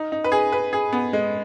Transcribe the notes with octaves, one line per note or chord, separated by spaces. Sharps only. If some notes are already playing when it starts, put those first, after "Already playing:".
Already playing: D#4
D#4
B4
G#4
B4
G#4
B3
G#3